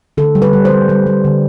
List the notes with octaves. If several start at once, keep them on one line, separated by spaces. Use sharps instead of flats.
D3 A4
G3
B4
G3
C5
G3
G3
G3
D3